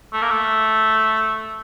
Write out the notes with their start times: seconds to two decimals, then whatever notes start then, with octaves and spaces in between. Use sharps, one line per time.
0.13 A3
0.22 A#3
0.30 A3